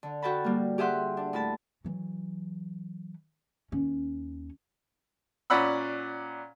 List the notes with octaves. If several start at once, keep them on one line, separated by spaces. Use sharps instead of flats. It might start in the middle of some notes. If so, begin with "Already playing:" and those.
D3
F#4 A4 G5 A5 B5
G3 A#3
G4 G#4 E5 F#5 C6 F#6
D4
A2 E4 A5
E3 F#3
D#2 C#4
A#2 C#4 D5 F#5 B5 E6